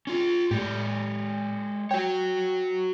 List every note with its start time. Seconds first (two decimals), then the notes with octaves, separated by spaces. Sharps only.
0.07 C#4 F4
0.51 A2 G#3 G4
1.91 F#4 C#5 G5